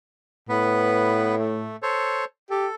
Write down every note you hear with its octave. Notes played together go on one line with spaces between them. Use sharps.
A2 B3 B4
A3
A4 C5 C#5
G4 A4